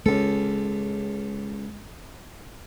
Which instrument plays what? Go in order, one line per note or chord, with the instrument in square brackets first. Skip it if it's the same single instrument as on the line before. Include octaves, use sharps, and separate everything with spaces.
[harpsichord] C#2 A4 [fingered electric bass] G#3